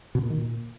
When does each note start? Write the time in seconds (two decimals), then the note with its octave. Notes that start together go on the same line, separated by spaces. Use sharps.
0.15 B2
0.23 A#2
0.30 D#3
0.38 A#2